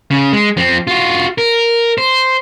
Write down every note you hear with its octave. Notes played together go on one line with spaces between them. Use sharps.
C#3
G#3
F3 C4
F4 F#4
A#4
C5